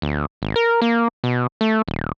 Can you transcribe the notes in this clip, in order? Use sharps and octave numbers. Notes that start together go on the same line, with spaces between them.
D2
G#1
A#4
A#3
B2
A3
D#1